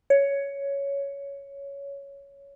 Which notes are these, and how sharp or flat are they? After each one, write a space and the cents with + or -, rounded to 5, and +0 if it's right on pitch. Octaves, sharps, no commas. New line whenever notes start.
C#5 +10